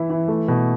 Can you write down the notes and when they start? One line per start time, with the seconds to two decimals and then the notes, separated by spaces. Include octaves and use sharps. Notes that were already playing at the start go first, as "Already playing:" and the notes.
Already playing: E3 E4
0.10 E3
0.28 A3
0.48 B2